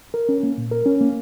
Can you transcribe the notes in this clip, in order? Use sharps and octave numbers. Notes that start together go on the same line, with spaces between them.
A#4
C#4
A#3
A#2
A#4
C#4
A#3